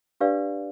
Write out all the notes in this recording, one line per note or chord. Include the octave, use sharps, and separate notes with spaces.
D4 G4 B4 D5 F5